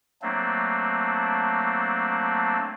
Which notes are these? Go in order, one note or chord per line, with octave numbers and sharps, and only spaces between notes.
F#3 A3 A#3 C4 D4